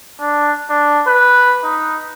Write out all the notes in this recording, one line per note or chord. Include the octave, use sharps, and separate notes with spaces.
D4
D4
B4
D#4